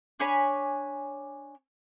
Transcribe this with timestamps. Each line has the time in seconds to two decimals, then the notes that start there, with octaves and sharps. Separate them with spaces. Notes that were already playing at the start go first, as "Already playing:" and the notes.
0.20 D4 C#5 G#5 B5